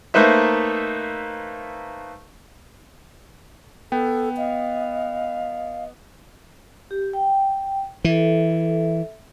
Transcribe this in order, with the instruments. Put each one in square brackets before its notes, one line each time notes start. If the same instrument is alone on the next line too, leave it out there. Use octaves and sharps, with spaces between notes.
[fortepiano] A3 A#3 D#4 B4 C5 E5
[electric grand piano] B3 [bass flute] A4 [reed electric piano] G5
[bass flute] D#5 [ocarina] F5
[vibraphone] G4
G5
[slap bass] E3 [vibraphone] A4 E5